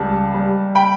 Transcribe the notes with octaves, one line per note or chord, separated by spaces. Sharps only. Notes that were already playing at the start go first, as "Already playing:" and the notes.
Already playing: C#2 G3 A5
G3
G5 B5